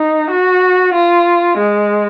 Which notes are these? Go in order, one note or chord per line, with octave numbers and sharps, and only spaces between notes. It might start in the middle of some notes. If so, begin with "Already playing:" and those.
Already playing: D#4
F#4
F4
G#3